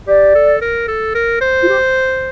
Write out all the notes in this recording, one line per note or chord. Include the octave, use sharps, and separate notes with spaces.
G4 D5
A4
A#4
A4
A#4
C5
F4
G4